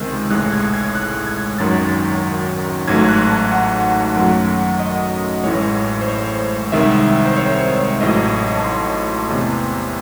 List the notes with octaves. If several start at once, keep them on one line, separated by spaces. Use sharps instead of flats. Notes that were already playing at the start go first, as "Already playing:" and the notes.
Already playing: C#2 C3 D#3 G#3
A1 A2 G#3 F#6
G#6
G#6
F#6
G#6
G#1 F#2 D#3 F#3 A6
A1 G#2 F#3 A3 G#6
G#6
F#6
A5
F#5
F#2 D#3 F#3 A3
D#5
A1 A2 E3 G#3 C#5
C5
C#5
C2 C3 D#3 G#3 E5
C5
C#5
C#5
A1 A2 F#3 D#5
A5
C6
E2 C3 E3 A3